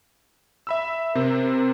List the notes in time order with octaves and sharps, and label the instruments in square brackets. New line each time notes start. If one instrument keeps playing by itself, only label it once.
[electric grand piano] E5 B5 E6
[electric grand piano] C3 C4 [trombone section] A#4